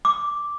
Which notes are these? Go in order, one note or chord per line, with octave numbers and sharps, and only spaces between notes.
D6